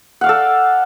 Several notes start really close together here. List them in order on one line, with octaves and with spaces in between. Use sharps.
F#5 F5 D5 A4